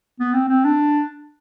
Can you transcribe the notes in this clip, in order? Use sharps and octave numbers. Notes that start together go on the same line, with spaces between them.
B3
C4
C4
D4